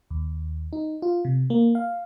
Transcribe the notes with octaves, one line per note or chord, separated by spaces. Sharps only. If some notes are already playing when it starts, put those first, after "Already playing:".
D#2
D#4
F4
C3
A#3
F5